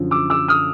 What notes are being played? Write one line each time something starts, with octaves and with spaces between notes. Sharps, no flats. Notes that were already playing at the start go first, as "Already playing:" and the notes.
Already playing: F#2 D3 F3
D6 E6
D6 E6
D#6 F6